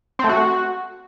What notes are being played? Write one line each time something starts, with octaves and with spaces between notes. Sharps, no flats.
C4
A3
F#4